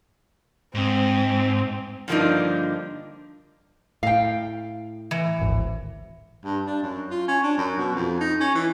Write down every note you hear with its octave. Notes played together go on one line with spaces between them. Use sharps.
G#2 C4
G2 D3 F3 A#3 D4 D#4
A2 F5 G5
E3
D1 G#1
G2
D4
F#2
F4
C#4
D4
F#2
B2
F2
D#4
C#4
E3